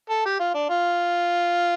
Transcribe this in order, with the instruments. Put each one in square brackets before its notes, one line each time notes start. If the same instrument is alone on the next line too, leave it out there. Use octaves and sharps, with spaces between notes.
[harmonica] A4
G4
F4
D4
F4